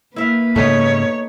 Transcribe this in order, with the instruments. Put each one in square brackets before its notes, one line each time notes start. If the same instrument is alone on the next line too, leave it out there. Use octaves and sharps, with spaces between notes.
[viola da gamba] A#3 B4 [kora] E4 E5 F5
[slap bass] G#2 C#3 [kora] A3 B3 D#4 [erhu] C#5